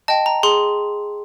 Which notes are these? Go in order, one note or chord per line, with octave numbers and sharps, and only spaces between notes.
D#5 G5 A5
A#5
G#4 C6